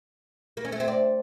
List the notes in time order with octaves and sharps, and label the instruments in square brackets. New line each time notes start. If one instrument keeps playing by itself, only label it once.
[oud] A#3
C#4
A3
C4
D4